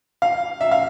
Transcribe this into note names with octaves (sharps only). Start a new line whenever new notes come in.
F5
E5
F5